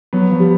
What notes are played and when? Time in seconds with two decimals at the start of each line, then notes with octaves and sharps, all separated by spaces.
0.13 F#3 B3
0.31 F3
0.40 G3